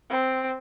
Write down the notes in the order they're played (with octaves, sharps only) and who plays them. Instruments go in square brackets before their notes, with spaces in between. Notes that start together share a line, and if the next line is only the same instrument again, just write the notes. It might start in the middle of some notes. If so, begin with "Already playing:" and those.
[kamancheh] C4